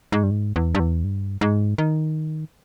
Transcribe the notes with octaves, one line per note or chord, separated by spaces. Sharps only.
G#2
G2
G#2
E2
G2
E2
G2
G#2
D#3